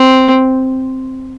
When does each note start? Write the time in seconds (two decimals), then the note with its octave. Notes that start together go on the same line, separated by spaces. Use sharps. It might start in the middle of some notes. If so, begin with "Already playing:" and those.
Already playing: C4